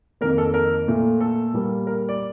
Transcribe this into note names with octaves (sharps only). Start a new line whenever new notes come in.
F2 D#3 A#3 A#4
A4
A#4
A#2 A3
A4
A#2 G3 A#3
A#4
D5